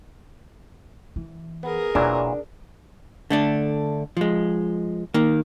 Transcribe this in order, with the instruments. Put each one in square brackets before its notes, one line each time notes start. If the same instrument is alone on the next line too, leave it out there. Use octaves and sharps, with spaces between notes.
[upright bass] E3
[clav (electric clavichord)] B3 [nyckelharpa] G#4 A#4
[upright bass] E1 [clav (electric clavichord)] A#2 E3 F#3 [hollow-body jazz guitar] D4
[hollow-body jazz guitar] D3 A3 D4
F3 G#3
D#3 A#3